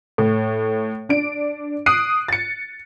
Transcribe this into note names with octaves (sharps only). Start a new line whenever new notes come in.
A2
D4 D7
D#6 F#6 C7 D7 D#7
A6 C#7